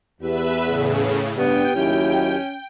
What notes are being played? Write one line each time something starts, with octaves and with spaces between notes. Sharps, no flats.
E2 B3 G4 B4 E5
A2 C#3 G#4
G2 B3 D4 G4 G5
D#2 F#3 C#4 E4